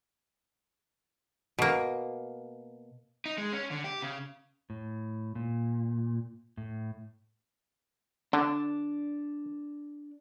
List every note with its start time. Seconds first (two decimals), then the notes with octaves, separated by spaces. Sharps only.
1.59 B2 A#3
3.26 D#4
3.38 G#3
3.53 C#4
3.71 D3
3.84 G4
4.02 C#3
4.70 A2
5.35 A#2
6.57 A2
8.33 D3 D4